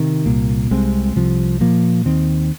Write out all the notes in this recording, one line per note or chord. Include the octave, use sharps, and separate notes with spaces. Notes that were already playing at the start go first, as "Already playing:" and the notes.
Already playing: C3 D#3
C2 A#2 A#3
C2 C3 G#3 C4
C2 C3 F3
A#2 F3 A#3
D#2 D#3 C4